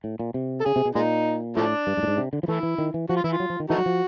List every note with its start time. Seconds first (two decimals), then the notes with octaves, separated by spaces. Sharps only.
0.04 A2
0.19 A#2
0.34 C3
0.60 A4
0.65 C#3 G#4
0.76 C3
0.85 B2
0.95 A#2 G#3 D#4
1.56 A2 F3 A3 D4
1.87 G2
1.97 G2
2.03 A2
2.07 G#2
2.17 C3
2.33 D3
2.43 F3
2.48 E3 A3 E4
2.63 E3
2.78 D#3
2.94 E3
3.09 F3 F#4
3.17 F4
3.24 E3 E4
3.32 F4
3.40 F#3
3.50 F3
3.60 D#3
3.70 E3 A3 D#4 F#4
3.78 F#3
3.86 F3